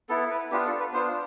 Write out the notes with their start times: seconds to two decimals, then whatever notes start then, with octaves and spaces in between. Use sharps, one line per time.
0.09 B3 E4 A4
0.31 B4
0.52 B3 D4 F4 G4
0.66 A4
0.80 B4
0.93 B3 D4 F4 C5